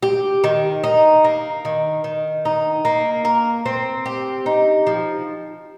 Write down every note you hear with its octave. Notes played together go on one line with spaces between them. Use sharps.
G4
D#3
D#4
A#3
D#3
D#3
D#4
A#3
A#4
C4
G4
D#4
F3